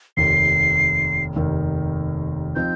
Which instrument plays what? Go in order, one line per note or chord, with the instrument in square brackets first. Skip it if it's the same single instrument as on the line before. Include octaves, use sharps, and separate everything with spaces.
[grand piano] F1 D#2 D#3 [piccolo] C7
[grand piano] F1 D#2 D#3
[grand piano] F3 C4 D#4 [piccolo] G6